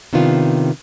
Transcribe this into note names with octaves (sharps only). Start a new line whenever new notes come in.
C3 D#3 B3 D4 F4